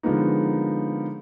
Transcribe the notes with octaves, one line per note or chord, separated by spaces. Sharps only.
D3 F3 G#3 A#3 B3 D#4